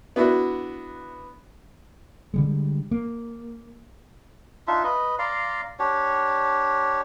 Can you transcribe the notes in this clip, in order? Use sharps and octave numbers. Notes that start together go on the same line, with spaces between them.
B3 D4 E4 F#4
D3 G3 G#3
A#3
D4 D#4 F4 E5
B4 D#5
D5 F5 A#5 C6
D4 G4 C#5